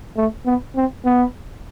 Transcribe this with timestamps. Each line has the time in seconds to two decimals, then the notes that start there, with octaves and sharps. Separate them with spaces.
0.17 A3
0.46 B3
0.76 C4
1.06 B3